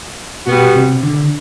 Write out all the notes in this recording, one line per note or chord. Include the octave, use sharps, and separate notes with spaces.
B2 G3 B3 F#4
C3
D3